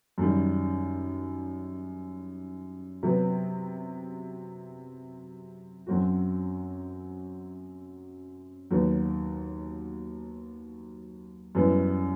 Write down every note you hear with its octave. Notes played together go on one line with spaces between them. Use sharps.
F#2 D#3 G3
C3 F#3 B3
F#2 F#3 C4 F#4
D#2 D#3 F#3 B3
F#2 E3 G3 B3